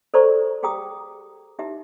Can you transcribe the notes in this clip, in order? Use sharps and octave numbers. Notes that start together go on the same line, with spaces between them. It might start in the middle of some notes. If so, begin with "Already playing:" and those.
A4 C5 D5 A#5 C#6
G4 G#4 G5 A#5 D#6
D#4 E4 G4 E5